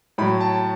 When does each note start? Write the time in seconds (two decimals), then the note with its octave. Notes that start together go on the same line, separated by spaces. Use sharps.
0.18 A2 F#3 B5
0.41 A5